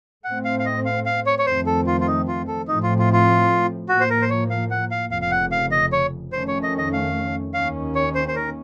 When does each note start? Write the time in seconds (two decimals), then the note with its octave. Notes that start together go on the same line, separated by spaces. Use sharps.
0.24 A2 A3 C4 F#5
0.45 F5
0.59 F5
0.66 D#5
0.85 F5
1.06 F5
1.26 C#5
1.39 C#5
1.46 F2 D#3 A3 C4 C5
1.66 A4
1.87 F4
2.00 F4
2.07 D#4
2.28 F4
2.47 A4
2.68 A2 F3 A3 C4 D#4
2.83 F4
2.99 F4
3.13 F4
3.89 A2 F3 A#3 F#4
4.01 C5
4.10 A#4
4.22 C5
4.30 C#5
4.50 F5
4.71 F#5
4.91 F5
5.10 F1 F2 C#3 F5
5.22 F5
5.31 F#5
5.52 F5
5.72 D#5
5.92 C#5
6.32 F2 D#3 A3 C#4 C5
6.48 C#5
6.63 D#5
6.78 D#5
6.93 F5
7.54 D#2 D#3 A#3 C#4 F5
7.95 C#5
8.15 C5
8.28 C5
8.36 A#4